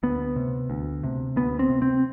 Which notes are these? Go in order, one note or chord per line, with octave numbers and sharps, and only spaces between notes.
D2 B3
C3
D2
C3
D2 B3
C4
C3
C4